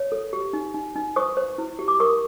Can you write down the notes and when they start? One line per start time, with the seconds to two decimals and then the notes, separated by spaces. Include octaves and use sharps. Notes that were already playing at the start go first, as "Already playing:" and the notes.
Already playing: C#5
0.12 A4
0.33 G4
0.53 D#4
0.74 D#4
0.96 D#4
1.16 C5 C#6 D#6
1.37 C5
1.58 E4
1.79 G4
1.88 D6
2.00 A#4 C#6 D#6